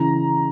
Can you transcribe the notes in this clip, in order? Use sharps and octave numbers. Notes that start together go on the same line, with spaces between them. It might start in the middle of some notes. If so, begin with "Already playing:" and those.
Already playing: C#3 E3 A#5